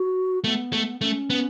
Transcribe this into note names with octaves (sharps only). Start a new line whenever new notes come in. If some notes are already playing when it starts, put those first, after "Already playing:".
Already playing: F#4
A3 B3
A3
A3 C#4
B3